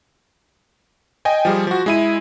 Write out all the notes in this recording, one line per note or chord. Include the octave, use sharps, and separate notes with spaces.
D#5 G5 G#5
F3 G3 G#4
F3 F#4
G#3 E4 D#7